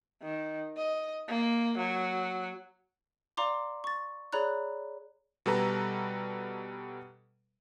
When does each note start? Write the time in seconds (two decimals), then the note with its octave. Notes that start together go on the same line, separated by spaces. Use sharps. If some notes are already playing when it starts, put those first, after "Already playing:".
0.22 D#3
0.77 D#5
1.29 A#3
1.78 F#3
3.37 D5 F5 A#5 C6 D6
3.84 C#6 A6
4.33 G#4 C#5 D5 A#5 B5 F#6
5.46 B2 G3 A4 B4 A#5